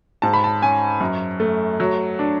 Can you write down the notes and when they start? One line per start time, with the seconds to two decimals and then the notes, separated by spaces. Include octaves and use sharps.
0.22 G#2 A5
0.33 B5
0.44 A5
0.62 C#4 G#5
1.00 F#2
1.40 A3
1.80 F#3
2.19 D4